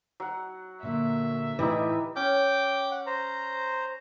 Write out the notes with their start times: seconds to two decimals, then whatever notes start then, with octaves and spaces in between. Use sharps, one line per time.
0.20 F#3 F#5
0.83 A#2 D3 A#3 E5
1.59 A2 E3 D#4 E4 G4 D5
2.16 C#4 G5 D6 G6
2.91 F#5
3.06 C5 A#5